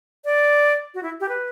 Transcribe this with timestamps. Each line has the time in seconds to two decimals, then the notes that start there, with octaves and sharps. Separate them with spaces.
0.25 D5
0.94 F#4
1.03 E4
1.20 G4
1.29 B4